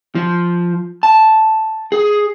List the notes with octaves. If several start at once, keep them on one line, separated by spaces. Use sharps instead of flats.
F3
A5
G#4